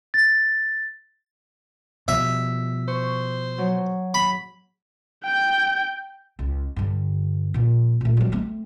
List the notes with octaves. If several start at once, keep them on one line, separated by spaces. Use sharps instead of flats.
A6
B2 F3 G3 E5
C5 C#6
F#3
B5
G5 G6
C#2
G2 D3
A#2 F3
A#2 A3
F#3 G3
A3 C4